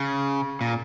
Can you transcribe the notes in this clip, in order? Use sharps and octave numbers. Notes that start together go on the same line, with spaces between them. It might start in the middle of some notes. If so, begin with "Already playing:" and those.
Already playing: C#3
A#2